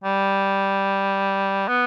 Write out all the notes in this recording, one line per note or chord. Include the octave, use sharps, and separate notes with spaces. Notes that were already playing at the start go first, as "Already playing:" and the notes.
G3
B3